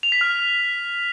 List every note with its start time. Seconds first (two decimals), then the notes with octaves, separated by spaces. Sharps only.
0.03 F7
0.12 B6
0.21 F6